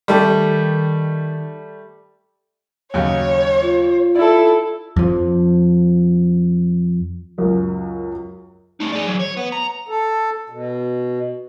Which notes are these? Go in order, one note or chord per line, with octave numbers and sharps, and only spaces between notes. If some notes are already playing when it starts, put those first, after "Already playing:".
D#3 G3 A3
D#2 C#3 F#3 C#5
F4
E4 A4 D5
F2 F3
C#2 F#2 A#4
A3 D#4
G#4 D5
E3 F#3
C#5
B3
A#5
A4
B2